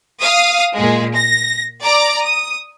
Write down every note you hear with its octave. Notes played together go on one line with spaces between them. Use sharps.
F5 D#6
A#2 G#3
A#6
D5 A#5 D6
D#6